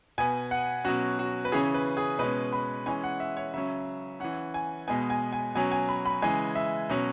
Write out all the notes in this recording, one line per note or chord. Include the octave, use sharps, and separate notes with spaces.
B2 B3 G#5
F#5
B2 F#3 C#4 F#4
F#4
B4
C#3 E3 C#4 G#4
B4
G#4
B2 G#3 C#4 B4
B5
E3 G#3 C#4 G#5
F#5
E5
C#5
C#3 F#3 C#4 E5
E3 C#4 F#5
G#5
B2 G#3 B3 G#5
G#5
G#5
B2 F#3 C#4 G#5
G#5
B5
B5
C#3 E3 G#3 G#5
E5
B2 F#3 C#4